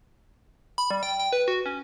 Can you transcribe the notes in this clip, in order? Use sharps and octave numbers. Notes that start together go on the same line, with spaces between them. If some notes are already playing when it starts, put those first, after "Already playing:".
B5
G3
G5
G5
B4
F#4
C#4